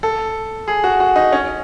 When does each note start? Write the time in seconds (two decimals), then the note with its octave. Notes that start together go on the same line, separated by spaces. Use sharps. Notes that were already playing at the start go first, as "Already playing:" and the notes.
0.03 A4
0.68 G#4
0.84 F#4
1.00 F#4
1.16 D#4
1.32 C#4